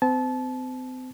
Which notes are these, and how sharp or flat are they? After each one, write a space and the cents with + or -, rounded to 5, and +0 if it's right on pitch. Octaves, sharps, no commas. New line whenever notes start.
C4 -35 A5 -25